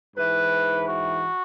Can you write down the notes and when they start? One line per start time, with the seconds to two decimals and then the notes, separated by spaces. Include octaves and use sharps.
0.15 G#2 E3 B4
0.86 F#4